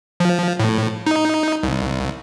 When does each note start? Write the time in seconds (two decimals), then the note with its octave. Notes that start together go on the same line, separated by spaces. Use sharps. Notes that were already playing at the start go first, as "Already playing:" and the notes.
0.20 F3
0.60 A2
1.07 D#4
1.63 C2